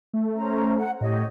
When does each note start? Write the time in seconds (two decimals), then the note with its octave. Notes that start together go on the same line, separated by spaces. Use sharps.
0.14 A3
0.35 C#4 C5 A#5
0.77 F#5
1.01 A2 G4 C#5 D#5